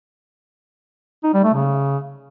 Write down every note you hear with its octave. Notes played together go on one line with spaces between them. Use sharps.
D#4
G3
A3
C#3